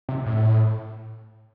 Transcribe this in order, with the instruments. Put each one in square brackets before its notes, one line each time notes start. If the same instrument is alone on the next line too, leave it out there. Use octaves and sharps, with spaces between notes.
[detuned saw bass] C3
A2